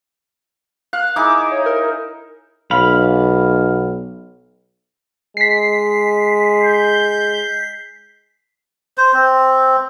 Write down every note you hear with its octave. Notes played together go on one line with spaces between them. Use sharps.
F5 F#6
D#4 E4 G#4 D6
C#5
A#4
B1 F5 B5
G#3 B6 C7
G6
C5
C4